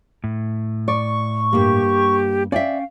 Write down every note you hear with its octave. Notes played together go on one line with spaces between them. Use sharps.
A2
D5 C#6
G2 A#3 G4
C#4 D5 E5 F5 G5